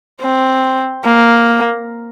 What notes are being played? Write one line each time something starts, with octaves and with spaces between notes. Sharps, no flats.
C4
A#3